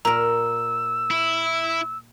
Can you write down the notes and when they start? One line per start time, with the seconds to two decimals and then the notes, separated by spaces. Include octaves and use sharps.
0.05 A#2 A#4 A#5 E6
1.11 E4